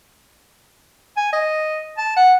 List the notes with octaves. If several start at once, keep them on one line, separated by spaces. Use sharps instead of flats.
G#5
D#5
A5
F#5